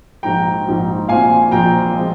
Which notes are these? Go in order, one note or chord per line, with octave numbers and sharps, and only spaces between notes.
A#1 G#2 F3 G5 A#5
A#1 G#2 F3
A#1 A#2 F3 C4 F5 G#5
A#1 A#2 F3 C4 G5 A#5
F3 G#3 C4